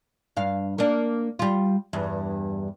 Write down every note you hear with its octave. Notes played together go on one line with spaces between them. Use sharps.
G2 F5
A#3 D4
G3 F4
E2 G2